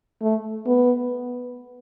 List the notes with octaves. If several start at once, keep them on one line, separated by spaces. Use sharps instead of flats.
A3
B3